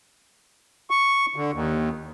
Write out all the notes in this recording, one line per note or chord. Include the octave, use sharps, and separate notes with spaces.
C#6
D3
D#2